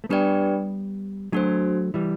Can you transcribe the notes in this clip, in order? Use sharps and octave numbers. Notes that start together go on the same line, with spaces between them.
A3
G3 B3 D4 G4 B4 D5 G5
F#3 A3 D4 F#4 C5
E3 G3